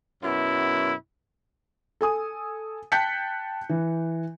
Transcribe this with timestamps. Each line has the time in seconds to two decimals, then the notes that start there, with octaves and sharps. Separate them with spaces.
0.23 F#2 B2 E4
2.01 A4 G#5 D#6
2.92 G5 A5 F#6 G6 B6 C#7
3.69 E3